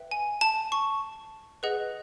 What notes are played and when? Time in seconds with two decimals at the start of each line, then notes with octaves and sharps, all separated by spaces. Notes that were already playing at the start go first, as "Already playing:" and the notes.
Already playing: B4 E5 G5
0.11 G#5
0.41 A5
0.72 C#6
1.63 G#4 B4 D#5 F#5